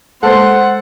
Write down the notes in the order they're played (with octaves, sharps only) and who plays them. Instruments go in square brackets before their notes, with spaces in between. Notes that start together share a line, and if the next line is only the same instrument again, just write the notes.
[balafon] G#3 A#3 F5 [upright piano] A4 [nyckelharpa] C5 [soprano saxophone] F#5